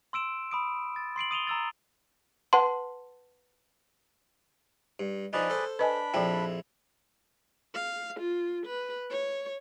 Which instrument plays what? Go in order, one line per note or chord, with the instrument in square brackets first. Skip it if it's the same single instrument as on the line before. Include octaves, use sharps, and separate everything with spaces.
[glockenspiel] C6 E6 D7 E7
B5 D#6 D7
A6
C6 C7 D7 F#7
D#6 D#7 F7 G7
A#5 E6 A6
[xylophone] B4 F#5 A5 C6
[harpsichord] G2
[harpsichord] F3 D4 D#4 [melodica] G#4 B4 D5
[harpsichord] A4 C5
[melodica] D4 B5 [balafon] B4 D#5 G#5
[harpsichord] A#1 F2 E4 [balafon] F3 G5
[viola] F5
F4
B4
C#5